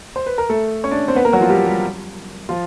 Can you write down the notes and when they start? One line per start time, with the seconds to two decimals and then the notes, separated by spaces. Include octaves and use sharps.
0.16 C5
0.26 B4
0.38 A#4
0.49 A3 A4
0.84 C#4 C#5
0.91 D4 D5
1.08 C4 C5
1.16 B3 B4
1.25 A#3 A#4
1.33 F#3 F#4
1.41 F3 F4
1.49 G3 G4
1.66 G3 G4
2.49 F3 F4